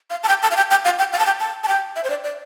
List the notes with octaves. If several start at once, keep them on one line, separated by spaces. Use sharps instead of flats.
F5
A5
G5
A5
F5
G5
G5
F5
G5
F5
A5
G5
A5
A5
G5
E5
C5
D5
D5